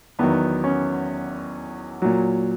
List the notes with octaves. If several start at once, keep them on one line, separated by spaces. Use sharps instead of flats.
E2 D#3 F#3 B3
C#4
A#2 F#3